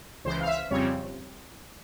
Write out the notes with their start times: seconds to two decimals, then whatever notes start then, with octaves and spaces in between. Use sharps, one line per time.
0.24 C#2 C#3 E3 C5
0.40 F5
0.47 E5
0.70 F2 C#3 G3 C4 C#5